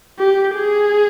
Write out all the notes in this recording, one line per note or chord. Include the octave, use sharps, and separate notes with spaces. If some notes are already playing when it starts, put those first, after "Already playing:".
G4
G#4